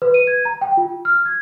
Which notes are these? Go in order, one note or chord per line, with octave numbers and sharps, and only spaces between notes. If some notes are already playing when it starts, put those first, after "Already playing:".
B4
D#7
G#6
A#5
G5
F4
F6
G#6